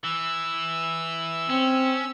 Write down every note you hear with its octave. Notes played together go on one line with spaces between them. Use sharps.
E3 E6
C4 C#4